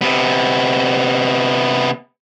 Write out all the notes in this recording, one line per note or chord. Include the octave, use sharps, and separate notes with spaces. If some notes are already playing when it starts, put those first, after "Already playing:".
C3 B3